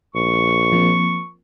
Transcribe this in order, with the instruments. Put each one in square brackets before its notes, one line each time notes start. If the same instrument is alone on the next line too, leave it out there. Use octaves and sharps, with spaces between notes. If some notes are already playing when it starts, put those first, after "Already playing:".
[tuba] A#1 [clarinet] C#6
[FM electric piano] F3 A#3 C4